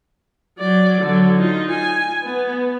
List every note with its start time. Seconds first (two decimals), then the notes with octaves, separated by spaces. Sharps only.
0.59 F#3 D5
1.01 D3 F#3
1.37 D#4 F4
1.70 G#5
2.22 B3